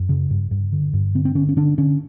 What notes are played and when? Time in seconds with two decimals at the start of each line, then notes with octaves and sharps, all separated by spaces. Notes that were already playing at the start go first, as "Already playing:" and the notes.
Already playing: F#2
0.09 C#3
0.30 G2
0.51 G2
0.72 D3
0.93 G2
1.15 D3 C4
1.25 C4
1.35 D3 C#4
1.49 C#4
1.57 D3 D4
1.78 D3 C#4